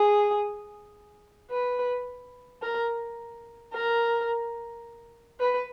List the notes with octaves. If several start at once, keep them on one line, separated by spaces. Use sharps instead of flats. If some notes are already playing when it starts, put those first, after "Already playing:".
Already playing: G#4
B4
A#4
A#4
B4